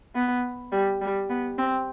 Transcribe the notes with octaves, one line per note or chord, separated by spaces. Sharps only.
B3
G3
G3
B3
C4